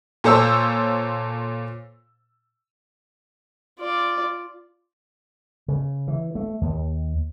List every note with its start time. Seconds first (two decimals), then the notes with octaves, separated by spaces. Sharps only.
0.24 A#2 A4 C5 C#5 E6
3.80 F4 D5
5.68 C#3
6.08 E3
6.35 A3
6.61 D#2